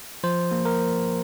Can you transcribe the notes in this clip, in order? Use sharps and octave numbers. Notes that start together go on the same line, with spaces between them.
F3 C5
A#3
A#4